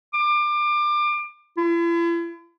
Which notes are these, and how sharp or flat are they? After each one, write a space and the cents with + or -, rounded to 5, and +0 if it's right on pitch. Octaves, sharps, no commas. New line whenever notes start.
D6 +30
E4 +45